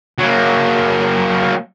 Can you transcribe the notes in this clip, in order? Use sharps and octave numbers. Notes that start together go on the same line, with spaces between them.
F#3 A#3